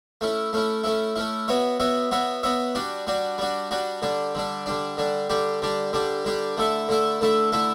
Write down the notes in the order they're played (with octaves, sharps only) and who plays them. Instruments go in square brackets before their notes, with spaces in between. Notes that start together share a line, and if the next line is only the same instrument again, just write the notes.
[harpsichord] A3 C#4 E4
A3 C#4 E4
A3 C#4 E4
A3 C#4 E4
B3 F#4 C#5 E5
B3 F#4 C#5 E5
B3 F#4 C#5 E5
B3 F#4 C#5 E5
G3 D4 F#4
G3 D4 F#4
G3 D4 F#4
G3 D4 F#4
D3 G3 D4
D3 G3 D4
D3 G3 D4
D3 G3 D4
D3 G3 D4 G4
D3 G3 D4 G4
D3 G3 D4 G4
D3 G3 D4 G4
D3 A3 E4 A4 E5
D3 A3 E4 A4 E5
D3 A3 E4 A4 E5
D3 A3 E4 A4 E5